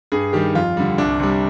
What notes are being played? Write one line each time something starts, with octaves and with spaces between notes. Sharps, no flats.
G2 G#4
D#3 G3 G4
F2 F4
D3 G3
C2 D4
C3 G3